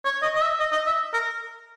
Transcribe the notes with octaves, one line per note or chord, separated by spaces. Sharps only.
C#5
D#5
D#5
E5
D#5
D#5
E5
A#4